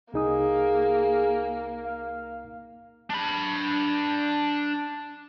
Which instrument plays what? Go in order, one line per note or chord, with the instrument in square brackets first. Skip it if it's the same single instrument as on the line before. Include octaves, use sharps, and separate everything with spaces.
[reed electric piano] C2 D#4 D#6 [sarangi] A#3 [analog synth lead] G#4
[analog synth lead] F5
[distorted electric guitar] D4 B5